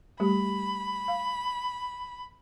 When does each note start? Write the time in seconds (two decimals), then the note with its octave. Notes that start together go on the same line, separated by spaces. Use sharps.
0.20 G3 A3 G4 B5
1.08 F5